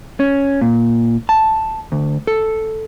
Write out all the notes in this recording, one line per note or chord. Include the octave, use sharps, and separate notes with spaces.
C#4
A#2
A5
D2
A4